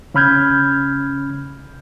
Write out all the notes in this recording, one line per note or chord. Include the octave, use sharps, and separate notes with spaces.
C#3 C#4 B5 F6 G6 G#6